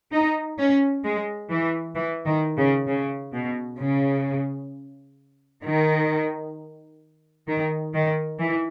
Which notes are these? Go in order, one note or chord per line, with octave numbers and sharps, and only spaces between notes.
D#4
C#4
G#3
E3
E3
D#3
C#3
C#3
B2
C#3
D#3
D#3
D#3
E3